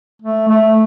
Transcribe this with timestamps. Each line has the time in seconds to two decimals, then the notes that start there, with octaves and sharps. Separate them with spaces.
0.22 A3
0.49 A3